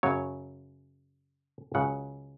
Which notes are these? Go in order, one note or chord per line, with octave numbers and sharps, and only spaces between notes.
F#2 C#3 F#3 C#5
C#2 C#3 F#3 F#5